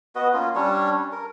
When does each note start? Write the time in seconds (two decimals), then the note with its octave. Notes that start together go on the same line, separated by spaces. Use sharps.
0.15 B3 F#4 B4 D#5
0.34 A#3 C#4 F4
0.55 G3 C#4 D4 C#5
1.12 A#4